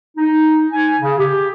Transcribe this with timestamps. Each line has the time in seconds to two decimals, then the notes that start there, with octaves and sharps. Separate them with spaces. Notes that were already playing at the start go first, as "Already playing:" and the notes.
0.17 D#4
0.72 G#5
0.99 C#3
1.18 G4